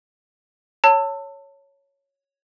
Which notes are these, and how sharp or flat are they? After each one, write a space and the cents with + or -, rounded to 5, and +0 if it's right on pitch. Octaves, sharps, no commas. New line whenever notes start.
C#5 +0 A5 +30 E6 +0